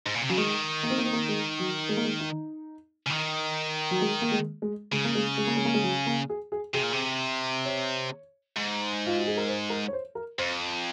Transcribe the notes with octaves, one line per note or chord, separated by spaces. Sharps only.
G#2
A#2
C3
C#3 F#3
D#3 G#3
A#3
C4
A#3
C4
A#3
G#3
F#3
G#3
A#3
G#3
D#4
C#3
D#3
F#3
G#3
A#3
G#3
G#3
C#3 G#3
A#3
G#3
G#3
A#3
G#3
A#3
G#3
F#3
A#3
G#4
G#4
C3 G#4
A#2
C3
C#5
G#2
F4
F#4
G#4
A#4
C5
A#4
C#5
C5
A#4
F2 C5